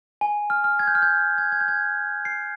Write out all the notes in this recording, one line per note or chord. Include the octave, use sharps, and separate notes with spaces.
G#5
F6
F6
G#6
G6
F6
G6
G#6
G#6
G6
G#6
C7